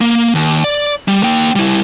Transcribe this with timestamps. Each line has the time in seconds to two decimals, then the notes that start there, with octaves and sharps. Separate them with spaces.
0.01 A#3
0.35 D#2
0.64 D5
1.08 G3
1.23 A#3 G5
1.56 G3 E4